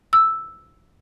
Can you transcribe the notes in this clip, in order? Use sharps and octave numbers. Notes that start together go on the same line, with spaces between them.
E6